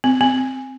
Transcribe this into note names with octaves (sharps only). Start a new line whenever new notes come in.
C4
C4